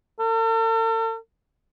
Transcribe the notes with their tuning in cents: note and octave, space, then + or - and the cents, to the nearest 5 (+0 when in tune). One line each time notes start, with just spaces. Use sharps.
A4 +45